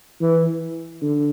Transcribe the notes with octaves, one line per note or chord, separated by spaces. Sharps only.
E3
D3